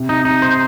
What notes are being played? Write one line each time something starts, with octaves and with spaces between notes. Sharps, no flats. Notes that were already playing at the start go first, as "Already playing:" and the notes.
Already playing: C3
D#4
D#4
C5